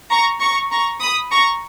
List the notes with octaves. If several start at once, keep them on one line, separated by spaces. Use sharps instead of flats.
A#5 C#6
A#5 C#6
A#5 C#6
B5 D#6
A#5 C#6